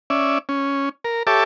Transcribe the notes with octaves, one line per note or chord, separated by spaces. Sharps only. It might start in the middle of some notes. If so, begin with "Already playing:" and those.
C#4 D5 E5
C#4
A#4
G4 A4 C#5 E5 A5 D6